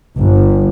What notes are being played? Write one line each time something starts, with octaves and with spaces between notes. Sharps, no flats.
G1